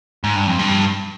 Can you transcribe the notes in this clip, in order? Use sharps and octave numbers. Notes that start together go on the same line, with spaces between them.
G#2
G2
F2
G2